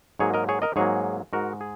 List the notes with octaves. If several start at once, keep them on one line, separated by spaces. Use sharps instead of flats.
G#2 F#3 A#3 G#4 C#5
A#4 D#5
G#4 C#5
A#4 D#5
G#2 F#3 A#3 G#4 C#5
G#2 G#3 F#4 A#4
G#4